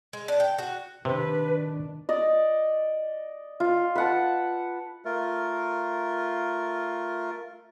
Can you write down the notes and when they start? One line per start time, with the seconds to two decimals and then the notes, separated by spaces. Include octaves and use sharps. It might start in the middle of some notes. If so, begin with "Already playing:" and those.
0.13 G#3
0.28 D4
0.40 G5
0.58 F#4
1.05 C3 D#3 D4 B4
2.09 D5 D#5
3.60 F4
3.95 B4 F#5 A5
5.05 A3 F4 A#4